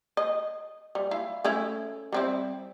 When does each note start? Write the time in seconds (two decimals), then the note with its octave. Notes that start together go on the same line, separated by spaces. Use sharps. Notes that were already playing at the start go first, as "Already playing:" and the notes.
0.17 D#5
0.95 G3
1.11 E4 F5
1.44 A3 C#4 E4
2.12 G3 C4 E4